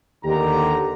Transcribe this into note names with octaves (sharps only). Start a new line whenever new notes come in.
D#2 D3 G4 A#5